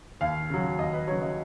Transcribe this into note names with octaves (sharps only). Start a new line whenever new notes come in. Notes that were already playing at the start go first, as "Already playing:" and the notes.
D#2 F5
C#3 F#3
D#2 D#5
B4
C#3 F#3 C#5
D#5